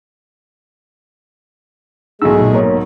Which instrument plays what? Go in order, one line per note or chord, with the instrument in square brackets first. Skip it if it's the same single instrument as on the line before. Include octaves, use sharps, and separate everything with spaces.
[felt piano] B1 G#2 [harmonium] G#3 A3 G#4 [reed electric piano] E6
[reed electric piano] A#2
A#3 A#4 C#5